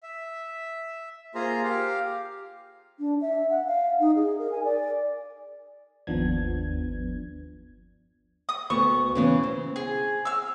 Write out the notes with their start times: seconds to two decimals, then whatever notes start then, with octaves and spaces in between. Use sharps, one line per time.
0.03 E5
1.35 A#3 F4 G#4 C5 A#5
1.63 G4 F5
3.00 D4
3.21 E5
3.50 F#5
3.67 F5
4.00 D#4
4.16 G#4
4.39 A#4
4.52 G#5
4.64 D5
6.07 G1 D#2 F3 B3 D4 G#6
8.49 D#6
8.70 D2 B3 C#6
9.15 C#3 E3 B3
9.43 C4
9.76 G#4
10.25 E6 F6